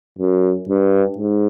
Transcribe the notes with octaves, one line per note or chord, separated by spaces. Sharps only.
F#2
G2
G#2